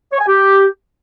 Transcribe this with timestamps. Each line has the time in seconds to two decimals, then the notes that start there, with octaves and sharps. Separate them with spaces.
0.12 C#5
0.20 G#5
0.27 G4